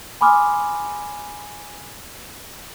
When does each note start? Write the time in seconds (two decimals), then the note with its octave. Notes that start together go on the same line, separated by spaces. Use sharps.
0.21 G#5 B5 C6 D6 D#6 F6